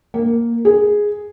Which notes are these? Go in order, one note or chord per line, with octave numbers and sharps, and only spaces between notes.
A#3
G#4